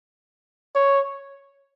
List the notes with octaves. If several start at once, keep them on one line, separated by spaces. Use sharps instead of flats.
C#5